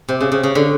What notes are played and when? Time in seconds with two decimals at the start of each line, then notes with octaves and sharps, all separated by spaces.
0.09 C3
0.21 C#3
0.32 C#3
0.43 C#3
0.55 D3